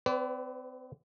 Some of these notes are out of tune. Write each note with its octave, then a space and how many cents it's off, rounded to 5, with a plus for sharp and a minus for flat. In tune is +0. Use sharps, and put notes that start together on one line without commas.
C4 -35 B4 +25 D5 -25